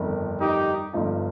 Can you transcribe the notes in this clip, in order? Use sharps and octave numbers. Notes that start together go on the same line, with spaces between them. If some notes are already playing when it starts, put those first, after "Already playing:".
Already playing: G1 F2 D#3
D#4 G4
G1 G2 F3 D#4